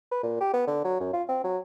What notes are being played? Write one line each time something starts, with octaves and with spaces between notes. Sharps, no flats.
B4
A#2
G4
B3
D3
F#3
F#2
F4
C4
F#3